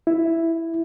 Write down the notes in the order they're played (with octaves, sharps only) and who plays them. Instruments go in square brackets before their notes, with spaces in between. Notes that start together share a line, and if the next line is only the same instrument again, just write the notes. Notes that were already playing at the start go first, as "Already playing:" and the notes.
[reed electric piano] E4